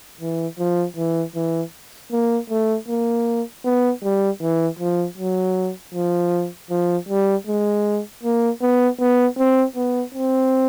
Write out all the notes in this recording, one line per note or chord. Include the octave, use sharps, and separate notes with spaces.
E3
F3
E3
E3
A#3
A3
A#3
B3
G3
E3
F3
F#3
F3
F3
G3
G#3
A#3
B3
B3
C4
B3
C4